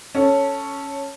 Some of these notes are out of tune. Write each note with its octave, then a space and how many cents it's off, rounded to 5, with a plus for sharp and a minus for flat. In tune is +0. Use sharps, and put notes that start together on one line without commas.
C#4 +0 A4 +0